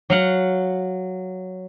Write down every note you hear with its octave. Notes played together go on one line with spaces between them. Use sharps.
F#3 F5 F#5